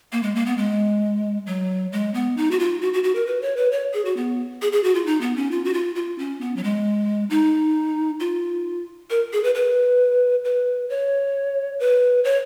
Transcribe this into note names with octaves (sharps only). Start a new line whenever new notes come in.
A#3
G#3
A#3
B3
G#3
F#3
G#3
B3
D#4
F#4
F4
F#4
F#4
F#4
A#4
B4
C#5
B4
C#5
G#4
F#4
B3
G#4
G#4
F#4
F4
D#4
B3
C#4
F4
F#4
F4
F4
C#4
B3
F#3
G#3
D#4
F4
A#4
G#4
B4
B4
B4
C#5
B4
C#5